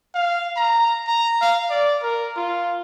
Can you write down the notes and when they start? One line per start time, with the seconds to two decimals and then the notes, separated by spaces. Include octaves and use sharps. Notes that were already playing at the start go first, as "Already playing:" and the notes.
0.15 F5
0.56 A#5
1.07 A#5
1.41 F5
1.70 D5
2.02 A#4
2.36 F4